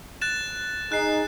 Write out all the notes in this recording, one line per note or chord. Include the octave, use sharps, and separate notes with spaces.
F#6 A6 E7
D#4 G#4 F#6 C7